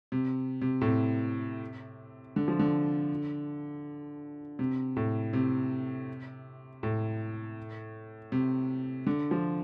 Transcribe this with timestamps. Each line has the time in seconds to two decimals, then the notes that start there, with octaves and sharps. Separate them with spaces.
0.12 C3
0.61 C3
0.81 A2
0.86 C3
2.36 D3
2.48 F3
2.59 D3
4.59 C3
4.97 A2
5.33 C3
6.83 A2
8.32 C3
9.07 D3
9.31 F3